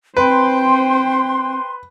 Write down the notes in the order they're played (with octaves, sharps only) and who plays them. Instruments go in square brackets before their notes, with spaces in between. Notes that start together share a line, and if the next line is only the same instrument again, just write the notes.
[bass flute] C4 [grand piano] B4 [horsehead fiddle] C5 G5 [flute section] C6